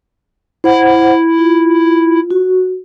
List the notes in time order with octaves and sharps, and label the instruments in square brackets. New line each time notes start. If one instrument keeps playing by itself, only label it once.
[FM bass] E4 [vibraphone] C5 F#5
[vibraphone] F4
F#4